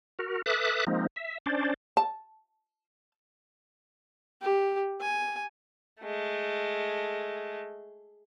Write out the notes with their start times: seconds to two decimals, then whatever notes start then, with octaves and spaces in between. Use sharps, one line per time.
0.19 F#4 A#4
0.46 A4 B4 E5 D6 D#6 F#6
0.87 F3 G#3 A#3 C4 D#4
1.16 E5
1.46 C#4 D4 C5 D5
1.97 A5
4.42 G4
5.01 G#5
6.01 G#3 A3